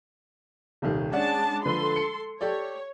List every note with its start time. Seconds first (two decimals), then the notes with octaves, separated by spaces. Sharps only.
0.82 D#1 C2 D#3
1.12 G#3 C#4 D4 D5 F#5 A5
1.66 D3 F3 A4 B4 C6
1.96 C#7
2.41 G4 A4 C#5 D5